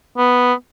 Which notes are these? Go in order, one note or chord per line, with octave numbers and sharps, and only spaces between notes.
B3